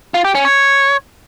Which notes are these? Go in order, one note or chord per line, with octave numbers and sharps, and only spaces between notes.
F4
G4
C#4
C#5